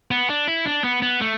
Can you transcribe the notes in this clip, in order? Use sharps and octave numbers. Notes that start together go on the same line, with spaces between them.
B3
D4
E4
D4
B3
B3
A3